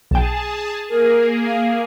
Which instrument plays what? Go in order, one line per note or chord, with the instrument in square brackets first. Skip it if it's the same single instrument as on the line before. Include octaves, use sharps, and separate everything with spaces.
[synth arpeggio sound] B1 G5 [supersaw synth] G#4 A5
[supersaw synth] A#3 G#4 [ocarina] A#4
[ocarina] F5